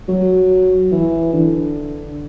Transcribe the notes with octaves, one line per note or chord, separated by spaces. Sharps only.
F#3
E3
D3